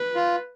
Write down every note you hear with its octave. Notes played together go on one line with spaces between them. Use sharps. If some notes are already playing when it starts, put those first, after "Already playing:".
Already playing: B4
F4